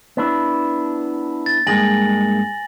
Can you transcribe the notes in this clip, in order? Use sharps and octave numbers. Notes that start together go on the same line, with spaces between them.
B3 D4 E4
A6
G2 G#3 A#3 G#5 A#6 F#7